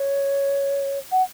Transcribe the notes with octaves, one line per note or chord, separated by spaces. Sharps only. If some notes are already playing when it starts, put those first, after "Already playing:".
Already playing: C#5
F#5